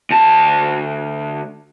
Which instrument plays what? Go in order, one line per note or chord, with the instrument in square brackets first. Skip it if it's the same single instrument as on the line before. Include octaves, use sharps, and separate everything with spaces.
[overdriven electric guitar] D2 A5